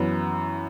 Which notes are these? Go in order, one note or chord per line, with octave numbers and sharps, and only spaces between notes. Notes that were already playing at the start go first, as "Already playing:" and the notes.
Already playing: F#2 E3 B3